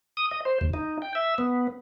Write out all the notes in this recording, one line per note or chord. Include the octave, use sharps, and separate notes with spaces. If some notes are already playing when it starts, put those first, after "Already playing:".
D#6
D#5
C5
D#2
D#4
G5
E5
B3